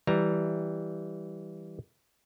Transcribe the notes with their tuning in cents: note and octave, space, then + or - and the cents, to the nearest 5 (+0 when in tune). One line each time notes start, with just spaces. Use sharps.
E3 -5 G3 +0 A#5 +0